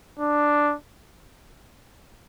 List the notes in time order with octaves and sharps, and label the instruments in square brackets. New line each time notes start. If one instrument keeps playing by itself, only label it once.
[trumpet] D4